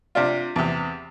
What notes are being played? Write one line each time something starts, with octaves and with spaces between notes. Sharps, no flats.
C3 D4 F4
E2 C3